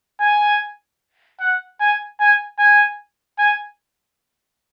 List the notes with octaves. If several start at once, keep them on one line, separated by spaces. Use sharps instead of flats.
G#5
F#5
G#5
G#5
G#5
G#5